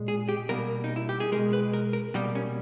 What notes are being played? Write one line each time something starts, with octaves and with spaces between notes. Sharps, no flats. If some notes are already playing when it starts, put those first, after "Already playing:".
Already playing: A#2 G#3
G#4
G4
B2 G3 A#3 A#4
D#4
E4
G4
G#4
B2 G#3 A#4
B4
A#4
A#4
B2 G3 A#3 G4
C#4